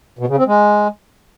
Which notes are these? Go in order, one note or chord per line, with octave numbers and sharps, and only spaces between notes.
B2
C#3
C4
G#3